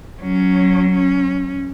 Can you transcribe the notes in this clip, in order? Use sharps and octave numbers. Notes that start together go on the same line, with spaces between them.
F#3 C#4
C#4